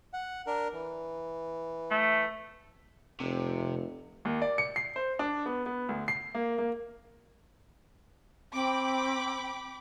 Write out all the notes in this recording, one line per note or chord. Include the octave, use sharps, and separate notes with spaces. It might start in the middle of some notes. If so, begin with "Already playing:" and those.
F#5
D4 A#4
E3
A3
F1 C3
D#2
D5
C#7
C7
C5
D4
B3
B3
D2
C7
A#3
A#3
C4 G5 B5 D6